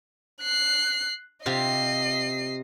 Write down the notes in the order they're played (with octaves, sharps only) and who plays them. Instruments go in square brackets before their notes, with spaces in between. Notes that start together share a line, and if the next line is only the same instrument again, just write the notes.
[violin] F#6 C7
[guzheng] C3 F4 G4 [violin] D#5 C7